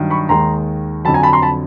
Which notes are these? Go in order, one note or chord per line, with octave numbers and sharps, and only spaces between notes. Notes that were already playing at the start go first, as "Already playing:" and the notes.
Already playing: G2 D#3 F#3
B5 C#6
D#2 D#3 G#3 A#5 C6
F2 D3 F#3 A5 B5
G#5 A#5
A5 B5
A#5 C6
A5 B5